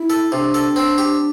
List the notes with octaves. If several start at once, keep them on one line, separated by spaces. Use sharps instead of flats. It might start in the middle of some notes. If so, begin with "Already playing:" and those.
Already playing: E4
A4
C3 D4
A4
C4
G4